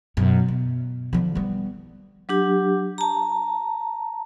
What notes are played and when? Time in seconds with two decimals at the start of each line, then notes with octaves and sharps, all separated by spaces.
0.17 F#2 B2
0.48 B2
1.13 D3 F3
1.35 G3 B3
2.29 F#3 D4 G4
2.98 A5 A#5